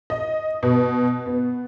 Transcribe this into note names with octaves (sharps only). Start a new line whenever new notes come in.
D#5
B2
B3